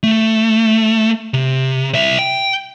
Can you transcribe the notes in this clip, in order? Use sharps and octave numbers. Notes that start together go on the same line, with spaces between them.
A3
C3
C2 E5
G5